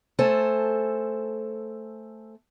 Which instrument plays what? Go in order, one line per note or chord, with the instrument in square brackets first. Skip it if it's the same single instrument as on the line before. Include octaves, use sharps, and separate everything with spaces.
[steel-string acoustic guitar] A3 A4 C5 G#5